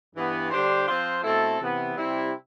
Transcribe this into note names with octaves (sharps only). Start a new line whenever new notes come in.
G2 E3 B3
D3 G3 D4 G4 C5
F3 C4 F4 C5
B2 A3 C4 E4 A4
C3 E3 B3
C3 G3 C4 E4